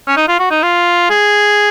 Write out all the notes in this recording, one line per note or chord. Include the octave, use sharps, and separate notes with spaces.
C#4
D#4
F4
F#4
D#4
F4
G#4